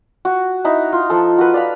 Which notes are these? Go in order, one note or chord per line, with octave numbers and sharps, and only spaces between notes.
F#4
D#4 E4 E5 A#5
F4
F3 A4
F#4 B4
D5 F5 B5